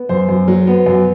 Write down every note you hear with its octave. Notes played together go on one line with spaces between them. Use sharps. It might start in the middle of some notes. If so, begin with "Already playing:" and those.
Already playing: B3
F#2 C5
F#2
F#3
B3
F#2